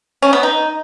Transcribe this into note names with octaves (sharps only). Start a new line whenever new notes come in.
C#4
B3
D#4